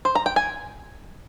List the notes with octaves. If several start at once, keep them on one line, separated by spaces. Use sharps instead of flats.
C5
A#5
G5
G#5